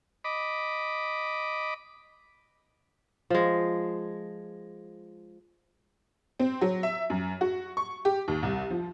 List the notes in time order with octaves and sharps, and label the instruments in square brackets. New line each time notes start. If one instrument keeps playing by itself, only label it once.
[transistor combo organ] D#5 B5 D6
[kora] F3 G#3
[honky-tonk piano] C4
F#3
E5
F#2
F#4
C#6
G4
D#2
C2
F3